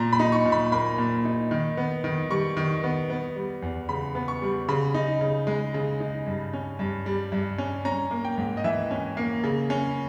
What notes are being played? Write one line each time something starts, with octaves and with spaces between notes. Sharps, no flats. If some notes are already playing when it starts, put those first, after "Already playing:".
Already playing: A#2 A#5
B5
D#4
C#6
A#2
B5
A#3 B5
A#2
D#4
D#3
B3
D#3
G3 C#6
D#3
B3
B3
G3
E2
C#3 B5
B3
C#6
G3
C#3 B5
D#4
C#3
G#3
C#3
D#4
G2
C#4
G2
G3
G2
C#4
C#4 A#5
A#3
G5
G#2
D#5
E3 E5
C#4
A#3
C#3
C#4